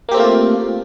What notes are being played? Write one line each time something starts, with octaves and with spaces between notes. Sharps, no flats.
A3 A#3 C4 F4 G4